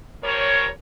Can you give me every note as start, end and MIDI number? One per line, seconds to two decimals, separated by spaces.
0.23 0.67 53
0.23 0.67 55
0.23 0.67 70
0.23 0.67 73